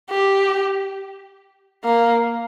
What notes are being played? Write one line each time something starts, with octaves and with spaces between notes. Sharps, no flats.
G4
A#3